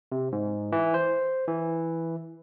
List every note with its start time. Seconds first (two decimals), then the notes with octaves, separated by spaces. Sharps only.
0.12 C3
0.32 G#2
0.72 E3
0.94 C5
1.48 E3